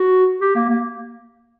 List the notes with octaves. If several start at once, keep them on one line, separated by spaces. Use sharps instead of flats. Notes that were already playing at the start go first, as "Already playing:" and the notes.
Already playing: F#4
G4
A#3
A#3